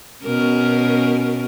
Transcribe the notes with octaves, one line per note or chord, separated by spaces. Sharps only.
B2 C#4 A#4